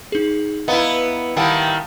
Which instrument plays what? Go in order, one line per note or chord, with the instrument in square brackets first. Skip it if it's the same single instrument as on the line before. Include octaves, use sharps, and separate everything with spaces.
[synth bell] D#4 G#4
[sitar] B3 E4 [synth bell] D#5 F5 A#5
[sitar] D#3 G3 E4 [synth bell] F5 F#5 A5